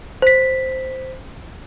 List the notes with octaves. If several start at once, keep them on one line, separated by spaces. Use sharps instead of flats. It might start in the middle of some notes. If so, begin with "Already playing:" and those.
C5 B6